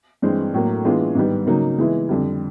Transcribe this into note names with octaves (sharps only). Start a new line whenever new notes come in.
G2 E3 G#3 C4
A2 F#3 A#3
E3 G#3 B3 D4 F4
G#2 D#3 G3 B3
C#3 F#3 A#3 D#4
E3 G#3 B3 E4
F2 D3 G3